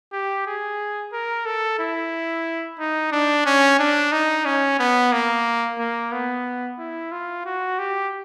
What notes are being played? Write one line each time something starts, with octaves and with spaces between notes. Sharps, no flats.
G4
G#4
A#4
A4
E4
D#4
D4
C#4
D4
D#4
C#4
B3
A#3
A#3
B3
E4
F4
F#4
G4